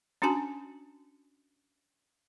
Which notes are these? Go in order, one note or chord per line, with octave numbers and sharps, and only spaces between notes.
C#4 D4 F#4 G#5 A5